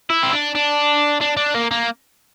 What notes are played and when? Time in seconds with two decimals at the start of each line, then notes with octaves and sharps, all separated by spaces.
0.10 E4
0.23 C4
0.33 D4
0.55 D4
1.21 D4
1.37 D4
1.55 A#3
1.71 A#3